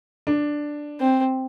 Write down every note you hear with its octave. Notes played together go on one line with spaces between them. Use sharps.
D4
C4